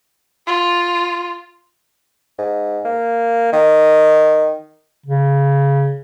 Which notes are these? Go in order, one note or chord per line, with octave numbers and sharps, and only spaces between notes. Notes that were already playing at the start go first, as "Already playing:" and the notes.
F4
G#2
A#3
D#3
C#3